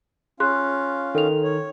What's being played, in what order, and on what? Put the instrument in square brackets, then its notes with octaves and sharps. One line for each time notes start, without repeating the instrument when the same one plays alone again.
[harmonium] C#4 F4 F5 [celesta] G#4 C6 F#6
[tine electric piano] D#3 [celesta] A4 F7
[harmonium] C#5